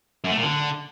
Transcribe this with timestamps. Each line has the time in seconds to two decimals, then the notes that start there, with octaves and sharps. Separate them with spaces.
0.24 F#2
0.30 A3
0.37 A#2
0.43 D3